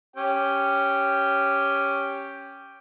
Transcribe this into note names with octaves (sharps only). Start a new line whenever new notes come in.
C#4 G4 G5